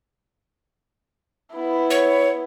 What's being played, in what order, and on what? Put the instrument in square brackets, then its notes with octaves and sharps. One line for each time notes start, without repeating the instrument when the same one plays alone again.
[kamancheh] B3 E4
[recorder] C#5